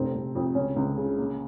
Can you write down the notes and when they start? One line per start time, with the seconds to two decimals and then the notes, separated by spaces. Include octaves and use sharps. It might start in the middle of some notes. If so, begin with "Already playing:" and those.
Already playing: F1 C4
0.15 F1
0.35 F2
0.55 C#2 C#4
0.76 C#2
0.97 C#3
1.18 A#3